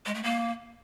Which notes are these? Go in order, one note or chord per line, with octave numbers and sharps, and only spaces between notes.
G#3
A3
A#3